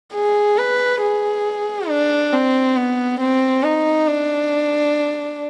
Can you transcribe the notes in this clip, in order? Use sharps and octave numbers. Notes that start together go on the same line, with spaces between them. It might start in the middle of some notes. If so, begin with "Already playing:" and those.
G#4
B4
G#4
D4
C4
B3
C4
D#4
D4